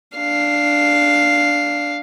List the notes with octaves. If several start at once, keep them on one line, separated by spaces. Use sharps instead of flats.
D4 F5